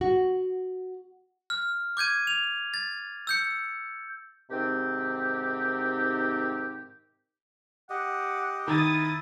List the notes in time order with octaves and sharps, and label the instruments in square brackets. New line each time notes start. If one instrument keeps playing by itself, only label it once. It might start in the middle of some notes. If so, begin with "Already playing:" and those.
[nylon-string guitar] F#4
[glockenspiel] F6
D6 G6 G#6 D#7
F7
A6
E6 G6 C#7
[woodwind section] G#2 C3 D#3 C4 G4
[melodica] G4 D#5 [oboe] F#5
[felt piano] D#3 [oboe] E4 [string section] D#6 A6